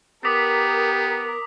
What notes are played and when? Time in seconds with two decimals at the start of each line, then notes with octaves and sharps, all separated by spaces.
0.25 B3 G4 A#4 D6 D#6 B6